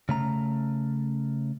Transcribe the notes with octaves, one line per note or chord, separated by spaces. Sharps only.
C#3 A3 A#5